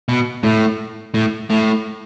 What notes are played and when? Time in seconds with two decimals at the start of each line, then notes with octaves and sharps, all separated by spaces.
0.09 B2
0.44 A2
1.14 A2
1.50 A2